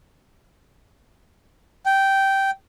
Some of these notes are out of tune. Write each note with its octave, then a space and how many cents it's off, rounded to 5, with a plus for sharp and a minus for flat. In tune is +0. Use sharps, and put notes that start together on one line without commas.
G5 -10